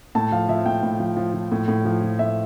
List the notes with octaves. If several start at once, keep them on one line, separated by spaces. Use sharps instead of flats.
A2 A5
F3 F5
F3 E5
A2 G5
A2
F3
F3
F3
A2
A2
F3
F3
A2 E5